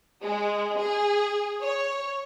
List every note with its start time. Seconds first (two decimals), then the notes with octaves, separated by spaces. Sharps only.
0.23 G#3
0.78 G#4
1.62 C#5